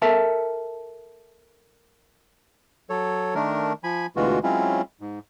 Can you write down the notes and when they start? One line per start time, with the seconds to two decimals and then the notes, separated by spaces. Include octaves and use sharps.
0.02 A4 A#4 E5 A5
2.90 F#3 A4 C#5
3.35 D#3 A3 D4 A#4
3.84 F3 G#5 B5
4.16 D2 B2 E3 G#3 F4 F#4
4.43 F#3 G#3 C4 C#4 E4 F4
5.01 G#2